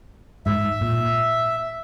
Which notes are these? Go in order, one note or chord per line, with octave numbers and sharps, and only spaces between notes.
G#2 E5
A#2